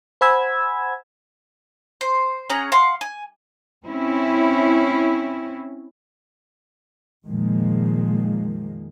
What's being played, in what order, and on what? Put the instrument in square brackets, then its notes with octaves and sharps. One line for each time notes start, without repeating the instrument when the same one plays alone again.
[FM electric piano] C5 F#5 G#5 B5 E6 G#6
[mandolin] C5
C#4 G#4 F#5 A#5
F5 F#5 C6
G#5
[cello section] C4 C#4 E4
[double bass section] F2 A#2 D#3 F3 G#3 A#3